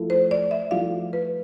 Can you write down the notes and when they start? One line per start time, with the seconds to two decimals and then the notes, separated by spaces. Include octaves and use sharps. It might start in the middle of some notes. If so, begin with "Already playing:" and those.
Already playing: F3 A3 E4
0.10 C5
0.31 D5
0.51 E5
0.71 F3 A3 E4 F5
1.13 B4